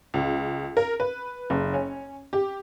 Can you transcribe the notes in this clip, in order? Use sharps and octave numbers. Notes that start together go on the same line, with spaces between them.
C#2
A#4
B4
F#1
C#4
G4